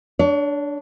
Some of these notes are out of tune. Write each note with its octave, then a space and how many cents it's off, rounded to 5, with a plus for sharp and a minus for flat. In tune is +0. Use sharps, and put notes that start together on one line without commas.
D4 +0 C#5 +35